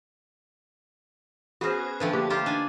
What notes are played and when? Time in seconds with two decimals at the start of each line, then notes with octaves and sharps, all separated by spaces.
1.61 B3 C#4 F#4 G#4 C5
2.00 D3 F3 A3 B4 G5
2.13 A#3 D4 G4
2.30 D#4 F4 G4 C5
2.46 D4 G#5